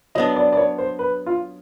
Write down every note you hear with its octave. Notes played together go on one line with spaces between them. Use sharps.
F#3 B3 D4 D#5
D5
D5
C#5
C5
B4
F4